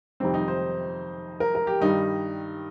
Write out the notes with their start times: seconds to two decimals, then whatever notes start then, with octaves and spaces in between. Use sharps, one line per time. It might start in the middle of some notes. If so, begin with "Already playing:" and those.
0.20 F2 C3 D#3 G3 C4
0.34 D#4
0.48 C5
1.40 A#4
1.55 A#4
1.67 G4
1.81 G2 D#3 G3 D#4